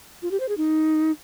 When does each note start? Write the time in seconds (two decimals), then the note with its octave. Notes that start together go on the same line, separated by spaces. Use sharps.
0.22 F4
0.31 G4
0.40 C5
0.49 G#4
0.57 D#4